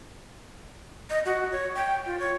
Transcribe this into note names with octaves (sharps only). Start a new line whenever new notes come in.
D#5
F#4
C#5
G5
F4
C#5